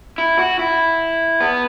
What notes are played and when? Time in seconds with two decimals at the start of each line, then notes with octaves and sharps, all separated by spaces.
0.18 E4
0.39 F#4
0.59 E4
1.41 B3